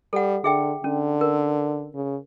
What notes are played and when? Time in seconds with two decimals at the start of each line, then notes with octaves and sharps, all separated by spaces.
0.13 G3 A4 F#5
0.44 D3 G#4 E5 G5
0.84 D3 C#4
1.21 A#4
1.95 C#3